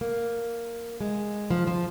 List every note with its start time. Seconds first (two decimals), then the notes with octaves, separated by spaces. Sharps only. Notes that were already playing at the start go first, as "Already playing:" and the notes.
0.01 A#3
1.01 G#3
1.50 F3
1.67 F3